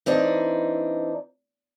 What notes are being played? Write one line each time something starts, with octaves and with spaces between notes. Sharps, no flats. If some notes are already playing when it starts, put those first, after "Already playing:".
E3 C4 D4 D#4